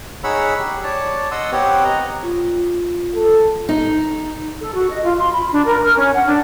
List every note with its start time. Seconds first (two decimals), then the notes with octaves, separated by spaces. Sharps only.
0.24 D#4 G#4 C#5 F#5 B5 E6
0.59 G4
0.84 C#5 D5 A5
1.31 D#5 F#5 C6 D#6 E6
1.52 B3 C4 G4 C#5 F#5
1.84 D#5 A#5
2.23 F4
3.14 A4
3.69 D#4
4.61 A4
4.74 F#4
4.91 D#5
5.04 F4
5.18 C6
5.34 B5
5.52 D4
5.65 A#4
5.84 F6
5.96 C#4
6.14 F#5
6.27 D4